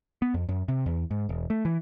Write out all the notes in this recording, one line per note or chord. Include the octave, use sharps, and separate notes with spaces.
B3
F2
F#2
C3
E2
G#2
E1
A3
E3